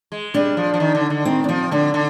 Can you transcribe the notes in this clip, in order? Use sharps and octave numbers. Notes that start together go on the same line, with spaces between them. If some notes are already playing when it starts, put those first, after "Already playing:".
G#3
G3 D4
F3
F3
D#3
D3
D3
D#3 C4
D4
F3 C4
D3 D4
D3